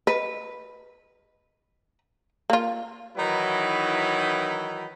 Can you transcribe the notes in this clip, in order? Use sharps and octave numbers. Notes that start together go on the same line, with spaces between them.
B4 D#5
A#3 F4
D#3 E3 F#3 D#4 E4 B4